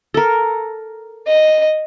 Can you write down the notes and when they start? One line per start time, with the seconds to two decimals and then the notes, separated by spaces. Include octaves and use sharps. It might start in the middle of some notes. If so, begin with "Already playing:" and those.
0.14 A4 A#4
1.27 D#5